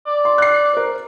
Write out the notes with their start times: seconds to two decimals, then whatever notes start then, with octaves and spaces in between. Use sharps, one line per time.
0.07 D5
0.25 C6
0.38 F#6 C7
0.74 A#4 C5